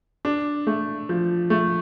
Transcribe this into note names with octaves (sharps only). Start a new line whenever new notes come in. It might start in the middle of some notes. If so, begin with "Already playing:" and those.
D4
A3
F3
A3